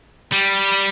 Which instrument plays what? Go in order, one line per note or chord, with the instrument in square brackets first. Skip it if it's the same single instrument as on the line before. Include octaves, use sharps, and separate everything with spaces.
[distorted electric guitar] G3